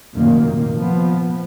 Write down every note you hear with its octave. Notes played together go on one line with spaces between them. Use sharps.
F1 F#2 A#2 D#3 A#3
F3 B3